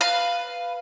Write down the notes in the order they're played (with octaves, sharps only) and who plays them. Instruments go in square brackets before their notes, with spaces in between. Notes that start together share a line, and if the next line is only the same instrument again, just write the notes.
[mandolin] B4 F5